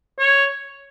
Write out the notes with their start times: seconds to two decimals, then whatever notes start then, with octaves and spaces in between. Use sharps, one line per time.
0.19 C#5